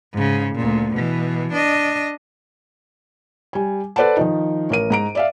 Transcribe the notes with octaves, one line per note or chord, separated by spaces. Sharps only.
G#2 C#3
D2 A#2
B2 E3
D4 D#5
G3 G#5
A4 B4 C5 D5 F#5 A5
D#3 F3 D#4
A1 A#4 D#7
G#2 A#5 D7
D5 E5 F5